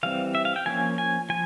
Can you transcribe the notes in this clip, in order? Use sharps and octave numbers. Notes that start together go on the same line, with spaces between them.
E3 G3 C4 F5
E5
F5
G5
F3 A#3 C#4 G#5
G#5
F3 G#5